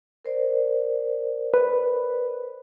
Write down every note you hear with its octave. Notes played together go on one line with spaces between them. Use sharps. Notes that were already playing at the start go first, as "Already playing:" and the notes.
A#4 C5 D5
B4